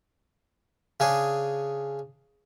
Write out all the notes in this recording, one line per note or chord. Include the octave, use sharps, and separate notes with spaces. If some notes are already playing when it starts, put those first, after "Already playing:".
C#3 D4 G#4